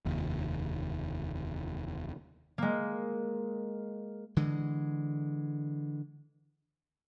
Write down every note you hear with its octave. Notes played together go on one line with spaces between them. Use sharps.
F1 D#2
G#3 A#3
D3 E3 G#3